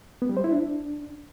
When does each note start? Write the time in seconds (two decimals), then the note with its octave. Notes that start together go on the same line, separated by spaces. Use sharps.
0.22 B3
0.29 G3
0.37 C5
0.44 E4
0.52 D4